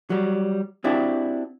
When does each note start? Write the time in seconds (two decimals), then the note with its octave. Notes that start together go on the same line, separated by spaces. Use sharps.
0.10 F#3 G3
0.84 C4 D4 E4 F#4 G4